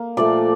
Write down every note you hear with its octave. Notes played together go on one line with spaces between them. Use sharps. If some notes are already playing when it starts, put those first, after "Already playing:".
Already playing: A#3
A#2 F3 A3 D5